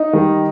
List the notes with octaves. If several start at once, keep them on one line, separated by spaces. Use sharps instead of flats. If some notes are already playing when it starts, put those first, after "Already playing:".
Already playing: D#4
D#3 G3